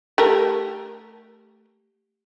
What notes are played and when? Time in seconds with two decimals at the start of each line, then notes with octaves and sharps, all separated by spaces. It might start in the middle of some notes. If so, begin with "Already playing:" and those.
0.18 A3 G4 A#4